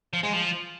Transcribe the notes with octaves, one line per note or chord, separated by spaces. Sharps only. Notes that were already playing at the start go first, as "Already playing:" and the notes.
F3
G#3
F3